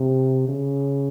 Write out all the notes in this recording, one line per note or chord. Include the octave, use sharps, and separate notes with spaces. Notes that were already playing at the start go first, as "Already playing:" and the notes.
Already playing: C3
C#3